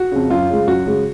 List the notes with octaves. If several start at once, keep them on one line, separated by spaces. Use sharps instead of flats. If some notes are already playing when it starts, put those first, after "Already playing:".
Already playing: F#4
F2 C#3
F#2 F4
C#3 G#3
F#2 F#4
C#3 G#3